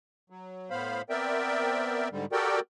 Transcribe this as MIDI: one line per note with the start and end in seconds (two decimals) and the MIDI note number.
0.30 0.70 54
0.70 1.02 45
0.70 1.02 59
0.70 1.02 72
0.70 1.02 77
0.70 1.02 83
1.10 2.08 59
1.10 2.08 60
1.10 2.08 70
1.10 2.08 74
1.10 2.08 76
1.10 2.08 79
2.11 2.25 44
2.11 2.25 50
2.11 2.25 55
2.32 2.60 66
2.32 2.60 67
2.32 2.60 69
2.32 2.60 70
2.32 2.60 74
2.32 2.60 79